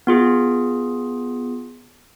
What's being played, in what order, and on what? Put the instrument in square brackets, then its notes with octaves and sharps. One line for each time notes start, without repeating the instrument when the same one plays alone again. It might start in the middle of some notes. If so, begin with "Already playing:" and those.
[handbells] B3 F4 G#4